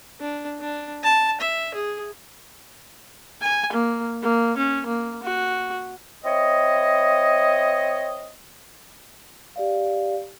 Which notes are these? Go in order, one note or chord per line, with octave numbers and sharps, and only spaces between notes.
D4
D4
A5
E5
G#4
G#5
A#3
A#3
C#4
A#3
F#4
C4 E4 C#5 D#5
G4 D5 F5